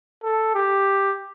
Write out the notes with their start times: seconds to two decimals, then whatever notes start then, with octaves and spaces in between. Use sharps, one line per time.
0.24 A4
0.55 G4